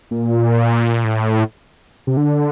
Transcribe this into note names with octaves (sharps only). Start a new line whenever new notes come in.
A#2
A2
C3
D3